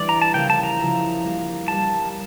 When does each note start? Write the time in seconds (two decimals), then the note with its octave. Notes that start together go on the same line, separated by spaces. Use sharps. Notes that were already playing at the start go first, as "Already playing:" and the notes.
Already playing: E3 G3 D4 D5
0.09 A#5
0.22 A5
0.34 C#3 F3 A#3 E4 G4 G5
0.50 A5
0.63 A#5
0.78 C#3 F3 A#3 E4 G4
1.24 G3 A#3 D4 G4
1.68 G3 A#3 D4 G4 A5